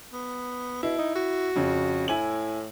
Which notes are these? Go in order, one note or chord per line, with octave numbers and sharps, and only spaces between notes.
B3
B2 E4
D#4
F#4
F2 C#3
A2 E4 G#5 F#7